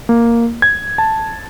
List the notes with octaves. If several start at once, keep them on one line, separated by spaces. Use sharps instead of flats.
A#3
G#6
A5